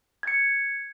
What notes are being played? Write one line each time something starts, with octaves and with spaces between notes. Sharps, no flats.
G#6 C#7